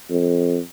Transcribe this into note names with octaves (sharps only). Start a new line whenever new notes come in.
F2